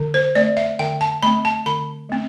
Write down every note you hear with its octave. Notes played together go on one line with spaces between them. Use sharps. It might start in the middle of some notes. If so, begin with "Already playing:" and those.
Already playing: D3
C5
A3 C4 D5
E5
D3 G5
A5
A3 C4 B5
A5
D3 B5
A3 C4